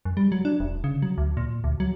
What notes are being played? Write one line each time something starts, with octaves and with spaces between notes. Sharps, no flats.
F#2
G3
F#3
D4
E1
C#3
F#3
D2
A#2
D2
F#3